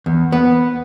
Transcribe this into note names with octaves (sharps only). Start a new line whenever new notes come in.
E2
B3